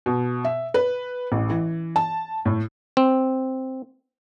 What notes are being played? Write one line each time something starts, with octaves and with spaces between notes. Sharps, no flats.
B2
E5
B4
A1
E3
A5
A2
C4